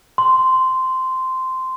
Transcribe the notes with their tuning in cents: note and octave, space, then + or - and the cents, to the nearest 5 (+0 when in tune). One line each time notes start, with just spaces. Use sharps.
C6 -10